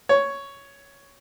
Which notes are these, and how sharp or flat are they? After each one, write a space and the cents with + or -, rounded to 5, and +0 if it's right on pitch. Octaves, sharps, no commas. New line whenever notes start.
C#5 +5